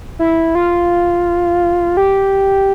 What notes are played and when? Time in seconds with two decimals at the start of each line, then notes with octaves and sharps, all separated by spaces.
0.19 E4
0.55 F4
1.97 G4